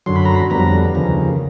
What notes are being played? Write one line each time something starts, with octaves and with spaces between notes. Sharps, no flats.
F#2 D3 F#3 C6
B5
A#5
B5
F2 D3 G3 B3 A#5
D#2 C#3 F3